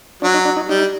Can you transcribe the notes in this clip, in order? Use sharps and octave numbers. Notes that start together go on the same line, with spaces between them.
F#3 D4
D#4
D4
D#4
G3 D#4